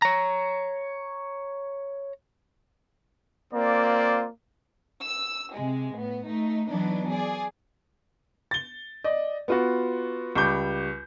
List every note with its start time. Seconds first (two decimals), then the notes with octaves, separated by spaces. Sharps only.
0.02 C#5 A#5
3.53 A#3 C4 F4 D5
5.04 E6
5.55 C3 G#3
5.95 A2 B3
6.26 A3 D#4
6.68 E3 F#3 B3 D4 D#4
7.10 G#4 D5
8.51 A6 G7
9.04 D5 D#5
9.48 B3 F4 F#4
10.35 C#2 G3 C#6 D6 G6